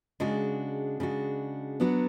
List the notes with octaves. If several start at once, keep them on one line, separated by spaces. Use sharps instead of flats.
C#3 G#3 D4 F#4
C#3 G#3 D4 F#4
F#3 B3 D4 F#4